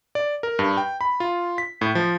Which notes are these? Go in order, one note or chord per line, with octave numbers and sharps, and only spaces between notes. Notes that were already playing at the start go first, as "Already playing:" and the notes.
D5
A#4
G2
G5
B5
F4
B6
A2
F3